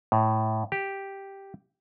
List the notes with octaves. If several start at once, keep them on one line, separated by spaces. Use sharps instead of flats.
A2
G4